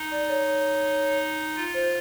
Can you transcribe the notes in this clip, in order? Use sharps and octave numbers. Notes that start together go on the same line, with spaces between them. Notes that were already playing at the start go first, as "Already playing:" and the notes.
Already playing: D#4
D5
C#5
F4
C5